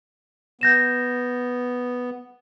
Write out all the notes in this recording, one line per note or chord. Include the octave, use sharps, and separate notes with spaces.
B3 G6 A#6 E7